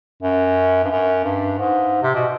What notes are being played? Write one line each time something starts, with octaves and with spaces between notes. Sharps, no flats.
F#2
G2
F#2
G2
G#2
C3
B2